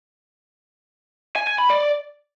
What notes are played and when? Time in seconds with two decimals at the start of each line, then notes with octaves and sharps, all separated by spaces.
1.36 G#5
1.47 G#5
1.58 B5
1.70 D5